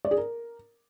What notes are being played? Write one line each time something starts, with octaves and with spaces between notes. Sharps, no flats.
D5
G#4
A#4